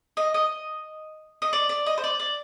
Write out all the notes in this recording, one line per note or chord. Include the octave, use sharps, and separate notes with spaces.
D#5
D#5
D#5
D5
D5
D#5
C5
D5
D5